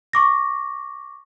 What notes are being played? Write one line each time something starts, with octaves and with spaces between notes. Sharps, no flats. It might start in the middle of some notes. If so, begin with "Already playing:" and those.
C#6 D6 A#6